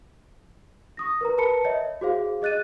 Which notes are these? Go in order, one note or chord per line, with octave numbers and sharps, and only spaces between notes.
C#6 D#6 A#6
A#4 B4 A#5
A#4 B4 A5 B5 C#7
C#5 D#5 E5
F#4 G#4 C5 F5
G#4 D#5 F#6 A6 D#7